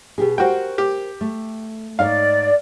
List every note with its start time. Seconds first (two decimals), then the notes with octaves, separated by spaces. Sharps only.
0.18 B2 G4 G#4
0.38 F#4 A#4 C5 G5
0.78 G4
1.21 A3
1.99 G#2 D#4 C#5 D5 F5